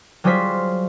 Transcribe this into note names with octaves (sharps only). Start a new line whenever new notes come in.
F#3 G3 F4 G#4 C5 B6